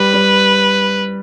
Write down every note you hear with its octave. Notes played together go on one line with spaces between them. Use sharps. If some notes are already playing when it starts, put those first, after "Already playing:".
Already playing: G3 B4
G3